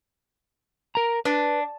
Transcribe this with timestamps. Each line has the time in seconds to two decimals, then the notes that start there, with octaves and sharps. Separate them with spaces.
0.95 A#4 A#5
1.25 D4 B4